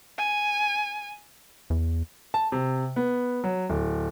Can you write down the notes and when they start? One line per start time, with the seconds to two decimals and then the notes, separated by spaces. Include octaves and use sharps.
0.18 G#5
1.70 E2
2.34 A5
2.52 C3
2.96 B3
3.44 F#3
3.70 D1